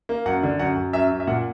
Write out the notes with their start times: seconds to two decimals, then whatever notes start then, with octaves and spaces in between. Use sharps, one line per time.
0.09 A#3
0.26 F#2 F#5
0.43 D3
0.59 F#2 F#5
0.76 F#2
0.93 F#2 E5
1.11 F#2
1.20 E5
1.27 A#2 F#5